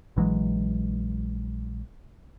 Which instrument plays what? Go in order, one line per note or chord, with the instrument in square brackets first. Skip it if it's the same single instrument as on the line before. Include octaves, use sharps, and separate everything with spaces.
[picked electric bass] A#1 E3 F#3 G#3